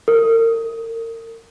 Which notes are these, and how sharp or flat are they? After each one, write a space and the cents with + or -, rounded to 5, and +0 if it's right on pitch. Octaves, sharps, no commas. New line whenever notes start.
A#4 -35